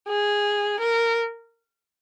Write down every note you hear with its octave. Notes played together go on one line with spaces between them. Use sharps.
G#4
A#4